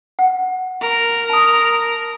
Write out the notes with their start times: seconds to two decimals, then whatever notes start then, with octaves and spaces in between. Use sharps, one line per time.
0.19 F#5
0.82 A#4
1.30 A5 D#6